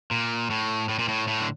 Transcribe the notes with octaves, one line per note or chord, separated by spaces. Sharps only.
A#2
A2
A2
A#2
A2
A2
D3